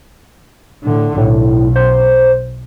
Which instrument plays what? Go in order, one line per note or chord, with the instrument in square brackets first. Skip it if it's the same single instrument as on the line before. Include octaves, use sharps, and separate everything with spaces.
[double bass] A2 D3
[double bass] B1 [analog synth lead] A2
[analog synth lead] C5